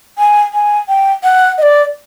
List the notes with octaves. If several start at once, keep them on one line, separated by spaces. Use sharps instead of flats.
G#5
G#5
G5
F#5
D#5
D5